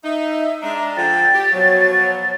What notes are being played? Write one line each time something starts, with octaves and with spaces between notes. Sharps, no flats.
D#4 E5
G#3 D4 A#5
D3 F3 G5 A6
G4
B2 F3 F#3 C#5